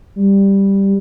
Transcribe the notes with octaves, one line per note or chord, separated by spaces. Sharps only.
G3